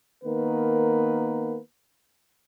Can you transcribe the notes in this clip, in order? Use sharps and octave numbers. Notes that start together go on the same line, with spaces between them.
D#3 A#3 B3 A#4 B4